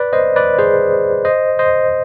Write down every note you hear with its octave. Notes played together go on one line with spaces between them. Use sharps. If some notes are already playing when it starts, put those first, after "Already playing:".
Already playing: B4 D5
C5 D#5
B4 D5
G#4 C5
C5 D#5
C5 D#5